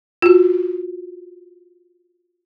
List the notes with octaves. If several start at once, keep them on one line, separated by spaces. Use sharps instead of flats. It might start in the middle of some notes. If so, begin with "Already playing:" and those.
F4 F#4